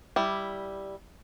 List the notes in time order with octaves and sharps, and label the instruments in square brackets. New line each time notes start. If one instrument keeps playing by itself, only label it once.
[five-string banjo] G3 E4